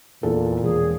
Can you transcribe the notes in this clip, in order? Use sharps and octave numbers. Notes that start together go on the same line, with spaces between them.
E2 A#2 A4
E1 G#4